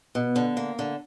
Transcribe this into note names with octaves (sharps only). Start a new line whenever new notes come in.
B2
D3
A#3
D3